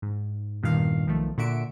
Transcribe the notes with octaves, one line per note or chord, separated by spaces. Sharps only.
G#2
E2 G2 A#2 D#3 F5
B1 D#3 F3 A3
A#2 D3 F#4 E5 C#7 D7